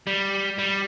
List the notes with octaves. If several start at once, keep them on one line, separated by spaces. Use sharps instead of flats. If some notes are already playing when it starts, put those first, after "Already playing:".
G3
G3